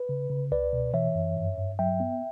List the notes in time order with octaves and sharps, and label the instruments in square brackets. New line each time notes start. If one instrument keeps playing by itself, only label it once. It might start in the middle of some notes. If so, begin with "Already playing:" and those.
Already playing: [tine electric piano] B4
C#3
C#3
C#2 B4 D5
B2
E3 C#5 E5
F#2
G2
G2
F#3 E5 G5
B3